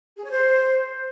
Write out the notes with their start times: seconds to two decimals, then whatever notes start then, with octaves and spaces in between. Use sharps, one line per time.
0.16 G#4
0.23 C#5
0.31 C5